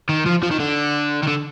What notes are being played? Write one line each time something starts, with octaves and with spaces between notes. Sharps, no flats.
D#3
F3
F3
D#3
D3
D#3
D3